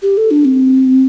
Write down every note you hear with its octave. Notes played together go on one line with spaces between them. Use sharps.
G4
A4
D4
C4